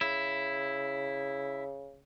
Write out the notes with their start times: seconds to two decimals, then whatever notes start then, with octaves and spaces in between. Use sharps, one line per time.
0.01 C#3 E4